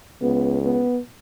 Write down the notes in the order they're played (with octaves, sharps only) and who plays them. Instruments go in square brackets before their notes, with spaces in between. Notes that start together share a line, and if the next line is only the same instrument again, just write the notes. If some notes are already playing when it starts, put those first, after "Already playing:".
[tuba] C#2 [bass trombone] B3
[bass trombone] B3